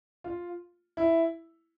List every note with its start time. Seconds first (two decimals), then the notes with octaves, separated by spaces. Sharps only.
0.24 F4
0.97 E4